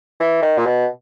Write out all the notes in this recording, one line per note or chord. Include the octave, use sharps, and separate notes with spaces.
E3
D#3
A#2
B2